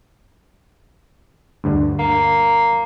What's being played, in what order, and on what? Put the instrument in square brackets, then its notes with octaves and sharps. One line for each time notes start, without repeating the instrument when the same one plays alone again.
[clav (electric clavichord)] D2 G2 D3
[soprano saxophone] A#3